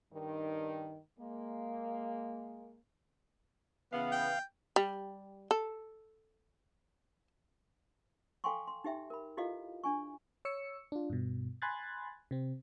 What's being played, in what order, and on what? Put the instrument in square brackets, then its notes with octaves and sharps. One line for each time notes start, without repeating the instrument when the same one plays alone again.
[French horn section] G2 D#3
G#3 A#3
[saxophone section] C#3 E3 B3 [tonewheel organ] F5
[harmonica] G5
[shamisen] G3
A4
[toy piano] A4 F5 G5 G#5 C6 C#6
C6
D#4 G4 E5 G5
A#4 B5
E4 F4 G4 A4 D#5 F5
D4 G#5 C#6
[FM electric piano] C#5 E6 C#7
D4 F4
G2 B2
G#5 B5 C6 F#6 G#6 A6
C3 C4